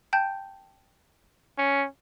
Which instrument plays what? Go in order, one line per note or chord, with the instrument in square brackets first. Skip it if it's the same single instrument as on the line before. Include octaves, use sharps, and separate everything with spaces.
[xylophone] G5 A5 G6
[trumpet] C#4